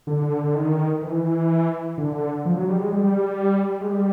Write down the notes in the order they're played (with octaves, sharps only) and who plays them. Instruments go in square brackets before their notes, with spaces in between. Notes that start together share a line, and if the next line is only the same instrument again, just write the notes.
[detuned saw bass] D3
D3
D#3
E3
D3
F3
F#3
G3
G#3
G3
G#3
G3